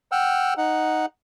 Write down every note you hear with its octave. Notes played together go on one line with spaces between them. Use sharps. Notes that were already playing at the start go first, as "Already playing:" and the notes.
F#5 G5 E6 F6
D#4 F#5